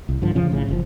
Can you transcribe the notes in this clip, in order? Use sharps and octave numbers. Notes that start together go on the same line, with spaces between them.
C2
G2 D3 F3
F2 C#3 F3 C#4
A#1 A2 C#3
F#1 B2 F3